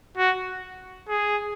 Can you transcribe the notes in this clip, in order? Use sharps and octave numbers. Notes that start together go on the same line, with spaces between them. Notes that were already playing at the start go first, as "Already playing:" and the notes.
F#4
G#4